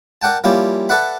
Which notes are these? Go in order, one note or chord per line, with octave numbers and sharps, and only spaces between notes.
A#4 D5 F#5 G5 A5
F3 G3 A#3 C#4 E4 G4
A4 B4 D5 E5 F#5 B5